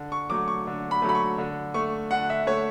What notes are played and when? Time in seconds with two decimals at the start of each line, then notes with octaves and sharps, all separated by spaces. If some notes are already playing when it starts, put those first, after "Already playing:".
Already playing: D3
0.12 C#6
0.30 F#3 A3 D6
0.48 C#6
0.67 D3
0.91 B5
1.02 F#3 A3
1.09 B5
1.15 C#6
1.38 D3
1.74 A3 C#6
2.11 D3 F#5
2.30 E5
2.47 A3 C#5